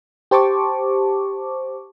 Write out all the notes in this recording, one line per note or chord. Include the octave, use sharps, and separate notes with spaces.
G4 C5 A5 C#6 D6